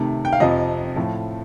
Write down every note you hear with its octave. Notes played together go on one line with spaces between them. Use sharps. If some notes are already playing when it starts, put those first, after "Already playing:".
Already playing: C3 D#3 A3
G5
F5
F2 C3 F3 D#5
A2 F3 A3